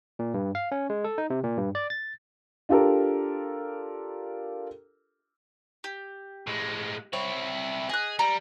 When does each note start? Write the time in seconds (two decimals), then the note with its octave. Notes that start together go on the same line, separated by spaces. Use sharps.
0.19 A#2
0.34 G2
0.55 F5
0.72 C#4
0.90 G#3
1.04 A4
1.18 D#4
1.30 C3
1.44 A#2
1.58 G2
1.75 D5
1.90 A6
2.69 D4 F4 G4 A4 A#4
5.84 G4
6.47 A2 G#3
7.13 C4 E4 C#5
7.89 G#4 D#5 F#6
8.19 G3 A#5